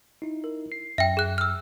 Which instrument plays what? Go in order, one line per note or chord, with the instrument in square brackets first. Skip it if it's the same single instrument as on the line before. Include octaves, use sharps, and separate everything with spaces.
[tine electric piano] D#4 E4
[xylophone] A#4
[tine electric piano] C7
[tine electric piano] F#2 [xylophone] E5 G5
[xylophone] G#4 F#6
E6 F6